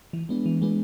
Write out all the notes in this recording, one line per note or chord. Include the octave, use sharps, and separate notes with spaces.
E3
G#3 B3 D4
E3
G#3 B3 D4